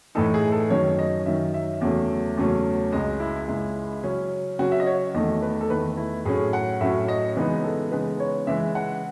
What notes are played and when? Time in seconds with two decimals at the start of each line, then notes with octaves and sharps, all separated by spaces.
0.15 A2 E3 A3 D#4 A4
0.34 G#4
0.52 A4
0.70 F#2 D#3 F#3 C#4 C#5
0.99 D#5
1.26 F#2 D#3 F#3 C#4 E5
1.54 E5
1.81 E2 C#3 F#3 A3 C#4
2.37 E2 C#3 F#3 A3 C#4
2.92 C#2 C#3 G#3 D#5
3.20 E4
3.48 C#2 C#3 G#3 E4
4.03 C#3 F#3 C#4
4.59 C#3 F#3 C#4 F#4
4.72 E5
4.80 D#5
4.87 C#5
5.14 E2 D#3 A3 D#5
5.42 B4
5.61 A4
5.70 E2 D#3 A3 B4
5.97 E4
6.25 A2 F#3 C#4 G#4
6.53 F#5
6.81 A2 F#3 C#4 E5
7.08 D#5
7.36 C#3 E3 G#3 B3 D#4 B4
7.64 A4
7.91 C#3 E3 G#3 B3 D#4 B4
8.20 C#5
8.47 C#3 E3 G#3 E5
8.75 F#5